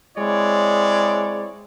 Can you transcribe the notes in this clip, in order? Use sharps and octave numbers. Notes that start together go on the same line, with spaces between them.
G#3 C4 E4 C#5 D5